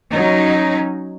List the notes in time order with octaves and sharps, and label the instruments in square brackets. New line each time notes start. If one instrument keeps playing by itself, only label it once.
[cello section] F#3 C#4 D#4